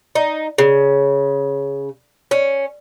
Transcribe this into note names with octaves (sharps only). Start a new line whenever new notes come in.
D#4
C#3
C#4